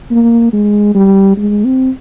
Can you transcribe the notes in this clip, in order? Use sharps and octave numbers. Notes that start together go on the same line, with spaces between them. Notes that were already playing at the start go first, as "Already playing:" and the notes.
A#3
G#3
G3
G#3
C4